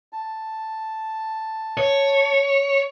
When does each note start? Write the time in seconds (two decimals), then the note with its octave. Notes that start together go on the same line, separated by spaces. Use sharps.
0.13 A5
1.77 C#5